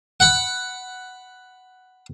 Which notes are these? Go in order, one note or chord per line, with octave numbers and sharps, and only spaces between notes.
F#5 B5